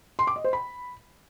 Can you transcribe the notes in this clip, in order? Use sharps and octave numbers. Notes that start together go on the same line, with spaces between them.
C6
D6
D#5
C5
B5